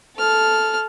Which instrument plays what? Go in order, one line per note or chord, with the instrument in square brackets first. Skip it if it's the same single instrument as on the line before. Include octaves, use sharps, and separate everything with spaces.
[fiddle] A4 F6